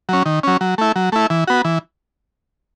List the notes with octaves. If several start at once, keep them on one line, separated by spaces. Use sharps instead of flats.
F#3 C#4
D#3
F#3 C#4
F#3
A3 E4
F#3
A3 E4
E3
B3 F#4
E3